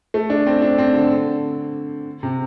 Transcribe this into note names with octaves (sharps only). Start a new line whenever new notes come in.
A3
D4
C4
D4
C4
D3
C3